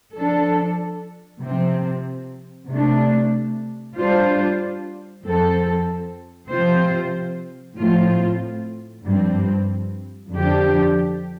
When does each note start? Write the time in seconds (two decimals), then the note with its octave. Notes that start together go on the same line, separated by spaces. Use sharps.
0.17 F3 D4 A4
1.43 C3 F3 C4
2.71 C3 A3 D4
3.97 G3 D4 F4 C5
5.25 F2 F3 C4 A4
6.51 C3 F3 C4 F4 C5
7.78 A2 F3 C4 F4
9.06 G2 F3 C4
10.33 F2 D3 F3 D4 G4